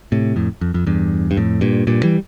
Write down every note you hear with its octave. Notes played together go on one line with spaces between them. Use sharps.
A2 C3
F2 A2
F2
F2
E2 G2
G2
F2 A2
G2 A#2
G2 A#2
E3 G3